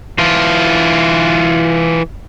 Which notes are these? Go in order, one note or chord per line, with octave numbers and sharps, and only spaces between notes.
E3 F4